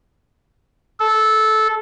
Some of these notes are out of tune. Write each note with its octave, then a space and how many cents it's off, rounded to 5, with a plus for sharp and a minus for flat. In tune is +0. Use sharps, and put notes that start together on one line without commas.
A4 -15